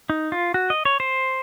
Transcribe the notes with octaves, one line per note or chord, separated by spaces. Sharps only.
D#4
F4
F#4
D#5
C#5
C5